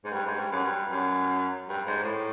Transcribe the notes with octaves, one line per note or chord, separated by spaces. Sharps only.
G#2
G2
G#2
G2
F#2
G2
F#2
G2
G#2
A2